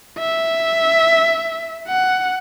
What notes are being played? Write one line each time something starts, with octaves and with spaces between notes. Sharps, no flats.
E5
F#5